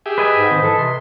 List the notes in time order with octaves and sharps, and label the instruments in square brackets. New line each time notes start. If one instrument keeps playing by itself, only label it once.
[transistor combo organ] G4 G#4 E5
[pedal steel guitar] B4 D#5 G#5
[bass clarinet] G#2
[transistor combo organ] D#3 C4
[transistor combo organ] E3 [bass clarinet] A4
[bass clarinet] C3 [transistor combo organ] C6